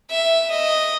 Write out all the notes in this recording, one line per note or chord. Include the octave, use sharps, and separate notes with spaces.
E5
D#5